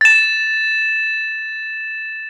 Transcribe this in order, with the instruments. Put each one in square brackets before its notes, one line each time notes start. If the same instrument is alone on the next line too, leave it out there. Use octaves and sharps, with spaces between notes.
[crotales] A6 E7